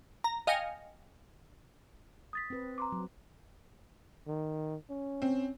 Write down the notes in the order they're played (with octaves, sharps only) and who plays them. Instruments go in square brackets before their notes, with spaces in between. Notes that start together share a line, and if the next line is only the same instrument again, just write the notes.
[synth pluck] A#5
D#5 F5 G5 G#5 A#6 C#7
[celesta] D#6 A6 B6
[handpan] C4 B4
[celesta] A#5 C6 D6
[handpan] F#3
[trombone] D#3
C#4
[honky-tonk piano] C4